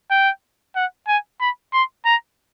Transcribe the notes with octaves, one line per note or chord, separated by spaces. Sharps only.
G5
F#5
G#5
B5
C6
A#5